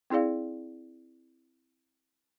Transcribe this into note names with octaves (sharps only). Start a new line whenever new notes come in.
C4 E4 G#4 D5 F5